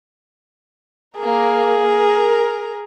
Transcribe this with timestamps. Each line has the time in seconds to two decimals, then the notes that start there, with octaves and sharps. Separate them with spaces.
1.19 A#3 G#4 A#4
1.88 A#4